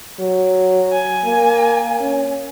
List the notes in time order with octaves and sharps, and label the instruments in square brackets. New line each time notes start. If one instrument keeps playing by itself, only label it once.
[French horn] F#3
[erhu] G#5
[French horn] A#3
C#4